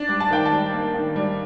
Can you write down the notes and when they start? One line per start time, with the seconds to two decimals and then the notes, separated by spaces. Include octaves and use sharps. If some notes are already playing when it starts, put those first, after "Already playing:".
Already playing: D4
0.09 G3
0.20 A5
0.30 D#3 G5
0.46 A5
0.51 G3
0.73 A#3
0.95 D#3
1.16 G3